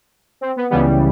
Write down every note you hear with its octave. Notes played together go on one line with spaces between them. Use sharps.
C4
B3
C#2 C#3 E3 G3 B3